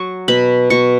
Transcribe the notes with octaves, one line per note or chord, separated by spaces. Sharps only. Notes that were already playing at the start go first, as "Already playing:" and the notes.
Already playing: F#3 C#6
B2 B5
B2 C#6